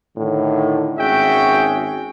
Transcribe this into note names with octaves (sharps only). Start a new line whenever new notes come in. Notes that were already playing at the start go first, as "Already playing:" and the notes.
A2 D3 D#3
G#1 C#4 F#4 G#4 E5 G5